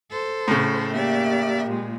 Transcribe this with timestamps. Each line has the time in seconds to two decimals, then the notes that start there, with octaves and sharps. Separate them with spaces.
0.10 A4 C5
0.48 A2 C#3
0.92 A#3 G4 D5 E5
1.67 A#2 G#3